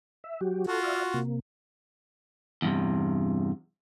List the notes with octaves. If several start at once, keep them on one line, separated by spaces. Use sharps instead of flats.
E5
F#3 F#4 G4
F4 F#4 A4
D5 E5 F5
C3 A#3
E2 G2 C3